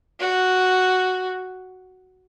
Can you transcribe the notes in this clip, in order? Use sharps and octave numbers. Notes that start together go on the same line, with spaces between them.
F#4